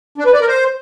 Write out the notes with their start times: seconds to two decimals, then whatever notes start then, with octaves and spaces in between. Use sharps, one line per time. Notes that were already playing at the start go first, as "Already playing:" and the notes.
0.18 D4
0.25 B4
0.33 D5
0.41 A#4
0.48 C5